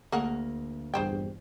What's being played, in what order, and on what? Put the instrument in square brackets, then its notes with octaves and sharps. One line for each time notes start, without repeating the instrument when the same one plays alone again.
[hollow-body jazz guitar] D2 A#3 [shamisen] G#4 A#4 F#5
[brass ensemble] A#1 E2 G2 [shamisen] G#4 C5 G5